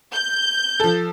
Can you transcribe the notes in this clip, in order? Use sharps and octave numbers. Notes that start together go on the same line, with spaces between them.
G6
F3 A4